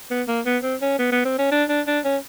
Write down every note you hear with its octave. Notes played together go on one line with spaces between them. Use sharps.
B3
A#3
B3
C4
C#4
B3
B3
C4
C#4
D4
D4
D4
C#4